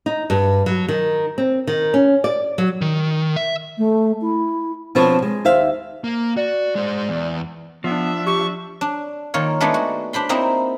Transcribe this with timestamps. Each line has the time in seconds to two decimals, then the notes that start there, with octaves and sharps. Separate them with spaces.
0.06 D#4
0.30 G2
0.66 F#3
0.88 D#3
1.38 C4
1.67 D#3
1.94 C#4
2.24 D5
2.58 F#3
2.81 D#3
3.36 E5
3.78 A3
4.22 E4
4.95 B2 F3 C4 D4 B4 C#5
5.22 G#3
5.45 D#2 C5 E5 F5
6.04 A#3
6.37 F#4 D5
6.75 G#3 C5
7.09 E2
7.84 F3 B3 D4 E5
8.27 G4 C#6
8.81 D4
9.34 D#3 A#3 F4 C#5
9.60 G#3 A3 B3 D4 D#4 G#4
9.74 F#4
10.13 D4 C5 B5 C6
10.29 A#3 C4 D#4 E4 D#5